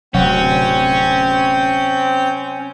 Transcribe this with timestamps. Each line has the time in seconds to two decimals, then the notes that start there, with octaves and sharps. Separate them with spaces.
0.14 D1 C3 F#3 C4 C#4 F#5 G6